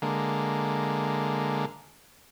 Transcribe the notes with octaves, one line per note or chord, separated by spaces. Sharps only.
D3 G#3 A#3